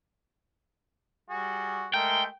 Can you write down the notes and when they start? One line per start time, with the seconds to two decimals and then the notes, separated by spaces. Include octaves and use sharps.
1.30 G3 F#4 G#4
1.94 G#3 A3 A#4 G5